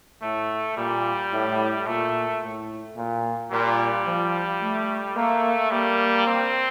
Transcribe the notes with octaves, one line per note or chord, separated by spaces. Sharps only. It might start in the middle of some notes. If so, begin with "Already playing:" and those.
A2 A3
A#2 G3
A2
A#2 A3
A2
A#2
A#2 G3
F3
A3
A3 A#3
G3 A#3
C4